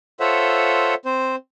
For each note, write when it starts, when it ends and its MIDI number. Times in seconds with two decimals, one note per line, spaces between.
0.20 0.94 65
0.20 0.94 69
0.20 0.94 72
0.20 0.94 73
0.20 0.94 76
0.20 0.94 78
1.05 1.36 60
1.05 1.36 72